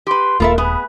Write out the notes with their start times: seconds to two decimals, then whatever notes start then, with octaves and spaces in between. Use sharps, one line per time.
0.07 G4 B4 C6
0.40 D#1 A#3 F4 A4 A#4 E5 F5 B5
0.58 B3 G#4 B4